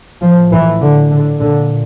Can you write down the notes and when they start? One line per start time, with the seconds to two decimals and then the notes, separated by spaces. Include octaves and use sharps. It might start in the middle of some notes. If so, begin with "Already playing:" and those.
0.22 A2 F3
0.51 E3
0.81 D3
1.10 D3
1.39 A#2 D3